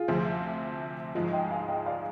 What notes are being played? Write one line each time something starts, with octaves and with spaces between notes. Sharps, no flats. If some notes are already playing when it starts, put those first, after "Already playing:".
Already playing: F4 G#4
D2 C3 F3 C4
G#2 F3 G#3 F4 G#4
D#5 G5
F5 G#5
D#5 G5
D5 F5